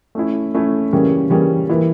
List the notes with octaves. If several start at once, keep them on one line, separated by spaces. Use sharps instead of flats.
A3 C#4 E4
A3 C#4 E4
C#3 E3 G3 A#3 C#4
C#3 E3 G3 A#3 C#4
E3 A#3 E4